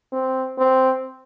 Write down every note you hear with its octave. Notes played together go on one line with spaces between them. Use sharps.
C4
C4